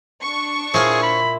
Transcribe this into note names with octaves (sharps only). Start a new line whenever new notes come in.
D4 C#6
A#2 E4 G#4 C5 C#5 F5
B5